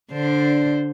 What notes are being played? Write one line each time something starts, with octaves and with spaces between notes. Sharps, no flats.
D3 D4 C5